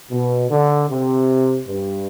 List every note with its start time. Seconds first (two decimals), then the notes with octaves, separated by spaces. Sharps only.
0.11 B2
0.51 D3
0.90 C3
1.68 G2